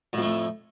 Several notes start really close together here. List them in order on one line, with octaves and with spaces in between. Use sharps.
A2 F2 A3